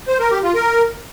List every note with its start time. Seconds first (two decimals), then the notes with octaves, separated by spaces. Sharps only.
0.08 C5
0.19 A#4
0.31 G4
0.43 F4
0.55 A#4